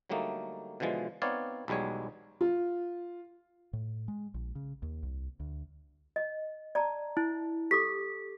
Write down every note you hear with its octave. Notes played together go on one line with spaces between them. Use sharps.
D3 F#3 G3 A3 A#3 D#4
B2 D3 E3 F3 G#3
B3 C4 D#4 C#5 D5 F5
B1 E2 G3 G#3 C#5
F4
A2
G#3
A#1
C#3
D#2
C2
D2
D#5
D5 A5 A#5
E4
G4 A4 D6 B6